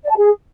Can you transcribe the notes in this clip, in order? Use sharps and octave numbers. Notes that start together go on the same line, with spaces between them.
D5
A5
G#4